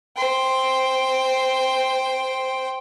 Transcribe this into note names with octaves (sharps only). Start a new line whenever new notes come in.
C5 G5